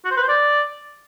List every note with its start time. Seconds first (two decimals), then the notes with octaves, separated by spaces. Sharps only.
0.05 F#4
0.11 C5
0.17 B4
0.23 C5
0.28 D5